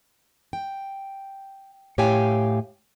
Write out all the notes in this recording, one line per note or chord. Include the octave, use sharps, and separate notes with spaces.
G5
A2 G4 C#5 F5 G5 G#5